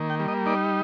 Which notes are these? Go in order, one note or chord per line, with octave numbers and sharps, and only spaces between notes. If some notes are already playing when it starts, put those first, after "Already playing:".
Already playing: D#3 A#3
G5
G3
D#5
D#4 D5